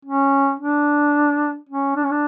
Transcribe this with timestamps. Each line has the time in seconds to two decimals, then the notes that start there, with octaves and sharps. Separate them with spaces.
0.05 C#4
0.60 D4
1.69 C#4
1.96 D4
2.04 C#4
2.11 D4